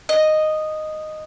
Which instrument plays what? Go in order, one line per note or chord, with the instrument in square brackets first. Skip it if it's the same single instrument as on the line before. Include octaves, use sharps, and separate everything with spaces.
[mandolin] D#5